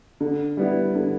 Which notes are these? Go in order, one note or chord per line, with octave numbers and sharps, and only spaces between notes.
D3
G3 B3 E4
D3